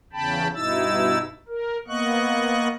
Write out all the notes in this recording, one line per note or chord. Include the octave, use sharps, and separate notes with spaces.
E2 C#3 G5 A5 B5
G2 B2 D#4 E4 E6 A6
A#4
A#3 B3 D#5 C#6 F#6